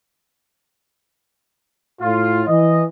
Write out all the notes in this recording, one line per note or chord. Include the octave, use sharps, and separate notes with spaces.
A2 F4
E3 D#5